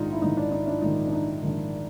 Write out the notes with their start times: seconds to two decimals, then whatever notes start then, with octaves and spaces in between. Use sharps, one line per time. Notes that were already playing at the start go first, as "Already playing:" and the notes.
Already playing: A#1 G#2 D#3 D#4 F4
0.13 E4
0.22 A#1 G#2 D#3 D#4
0.37 D4
0.52 D#4
0.67 D4 E4
0.82 A#1 G#2 D#3 D#4
1.08 D4
1.12 D#4
1.42 A#1 G#2 D#3